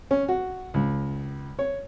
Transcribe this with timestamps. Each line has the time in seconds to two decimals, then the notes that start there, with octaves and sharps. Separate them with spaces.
0.11 C#4
0.28 F#4
0.74 C#2
1.59 C#5